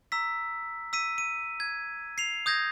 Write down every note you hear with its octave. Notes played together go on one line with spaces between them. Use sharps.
A#5 E6 B6
E6 B6 D#7
D#7
G#6
C7 F7
D#6 G6 G#6 A#6